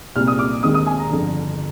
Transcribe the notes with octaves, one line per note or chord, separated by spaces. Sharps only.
C2 A#2 G3 C4 F6
D#6
D6
D#2 D#3 G#3 C4 D#6
D#6
G#5
A#5
G1 F2 D3